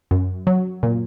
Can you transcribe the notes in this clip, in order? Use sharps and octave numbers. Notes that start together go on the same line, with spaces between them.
F#2
F#3
A#2